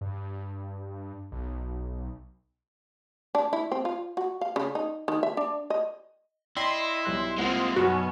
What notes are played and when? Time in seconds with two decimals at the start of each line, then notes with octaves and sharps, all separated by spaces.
0.01 G2
1.32 B1
3.35 D4
3.53 E4
3.72 C4
3.85 F4
4.17 F#4
4.41 F5
4.56 C#3
4.75 D#4
5.08 D#3
5.23 E5
5.37 D4
5.70 D#5
6.57 E4 D5 D#5 G5 C6 A#6
7.05 B1 G3 F#6
7.38 C2 G#3 A#3 C4 F4 F#5
7.76 B1 F#2 B3 C#4 F#4